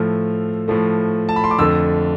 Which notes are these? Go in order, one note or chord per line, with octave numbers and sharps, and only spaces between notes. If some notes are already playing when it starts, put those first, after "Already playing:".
Already playing: A2 F3 A3 F6
A2 F3 A3
A5
B5
C6
D6
F2 D3 A3 E6